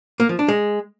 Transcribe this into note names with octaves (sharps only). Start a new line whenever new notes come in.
A#3
F3
D4
G#3